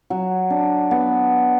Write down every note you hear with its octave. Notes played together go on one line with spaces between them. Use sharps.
F#3
D4
B3